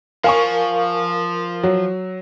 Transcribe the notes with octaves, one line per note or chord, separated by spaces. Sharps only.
F3 A#4 F5 G#5 C#6
F#3